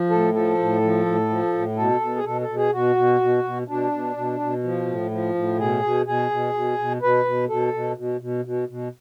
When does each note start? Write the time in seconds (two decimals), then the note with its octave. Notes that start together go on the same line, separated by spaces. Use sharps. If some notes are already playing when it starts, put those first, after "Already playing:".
Already playing: F3
0.10 A2 A4
0.33 F3 A4
0.58 A2
0.82 F3
1.06 A2
1.30 F3
1.53 A2
1.76 B2 A4
2.01 B2
2.16 G#4
2.25 B2 A4
2.41 A4
2.49 B2
2.57 G#4
2.72 B2 F#4
2.96 B2
3.21 B2
3.44 B2
3.68 B2 D4
3.92 B2
4.16 B2
4.40 B2
4.64 F3
4.86 A2
5.11 F3
5.34 A2
5.58 B2 G#4
5.83 B2
6.07 B2 G#4
6.31 B2
6.54 B2
6.78 B2
7.02 B2 B4
7.25 B2
7.49 B2 A4
7.74 B2
7.97 B2
8.21 B2
8.45 B2
8.68 B2